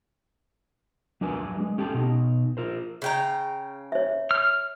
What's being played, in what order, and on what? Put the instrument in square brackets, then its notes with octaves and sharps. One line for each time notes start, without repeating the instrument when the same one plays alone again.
[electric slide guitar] F#3 D4 A#4 B4 G#5
G#3
C#4 G4 A4 A5
B2 D#4
F4 A#4 C5
[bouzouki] C#3 G5 A#5
[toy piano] C#5 E5
[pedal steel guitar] F6